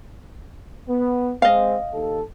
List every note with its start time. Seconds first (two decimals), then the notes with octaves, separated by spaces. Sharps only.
0.88 B3
1.42 G#3 C4 D#5 F5
1.92 D#2 A4